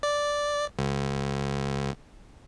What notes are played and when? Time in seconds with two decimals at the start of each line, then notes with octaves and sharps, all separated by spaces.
0.03 D5
0.79 C#2